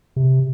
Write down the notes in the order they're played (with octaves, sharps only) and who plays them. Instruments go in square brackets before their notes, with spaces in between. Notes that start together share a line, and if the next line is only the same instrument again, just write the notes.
[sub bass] C3